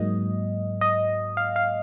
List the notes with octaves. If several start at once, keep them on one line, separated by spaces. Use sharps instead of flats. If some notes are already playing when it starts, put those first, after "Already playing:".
Already playing: G#2 F#3 A#3 D#5
D#5
F5
F5